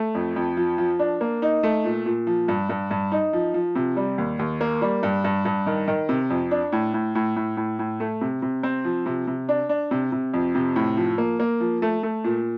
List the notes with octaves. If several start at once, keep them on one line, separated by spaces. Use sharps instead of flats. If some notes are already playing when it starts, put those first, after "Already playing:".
Already playing: A3
F2
F2
F3
F3
D4
A#3
D#4
A3
A#2
A#2
F3
G2
G2
G2
D#4
F3
F3
C3
G3
D#2
D#2
A#3
G3
G2
G2
G2
D#3
D#3
C3
F2
D4
A2
A2
A2
A2
A2
A2
A3
C3
C3
C4
F3
C3
C3
D4
D4
C3
C3
F2
C3
A2
F3
A#3
A#3
F3
A3
A3
A#2